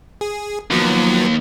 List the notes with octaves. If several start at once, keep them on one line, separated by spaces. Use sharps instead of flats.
G#4
D#2 F3 F#3 B3